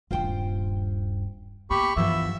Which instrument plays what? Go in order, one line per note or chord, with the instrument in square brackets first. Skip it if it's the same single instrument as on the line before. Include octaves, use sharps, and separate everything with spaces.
[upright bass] D#1 G2 [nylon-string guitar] F4 C5 G5
[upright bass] A#3 B3 [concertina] G4 B5 C#6
[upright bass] G2 [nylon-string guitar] E3 F3 B3 [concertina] E5